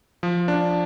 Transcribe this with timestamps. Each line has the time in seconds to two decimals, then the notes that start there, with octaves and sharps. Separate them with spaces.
0.23 F3
0.48 D4